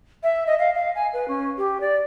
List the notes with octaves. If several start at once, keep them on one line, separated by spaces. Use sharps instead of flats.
E5
D#5
F5
F5
G#5
B4
C#4
G4
D5